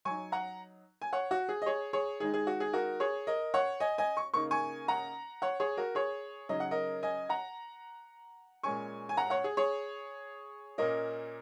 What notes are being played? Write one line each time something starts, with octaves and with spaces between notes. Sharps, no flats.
F#3 D#4 G#5 C#6
F#5 A#5
G#5
C#5 F#5
F#4
G#4
D#5
G#4 C#5
G#4 C#5
D#3 G#3 D#4 G#4
G#4
F#4
G#4
F#4 A#4
G#4 C#5
A#4 D#5
C#5 F#5
D#5 G#5
D#5 G#5
C#6
C#3 A#3 D#4 C#6
G#5 C#6
F#5 A#5
C#5 F#5
G#4 C#5
F#4 A#4
G#4 C#5
C#3 F#3 D#4 D#5
F#5
A#4 D#5
D#5 G#5
F#5 A#5
A#2 G#3 C#4 G#5 C#6
G#5
F#5 A#5
C#5 F#5
G#4
G#4 C#5
A#2 A#3 C#4 A#4 D#5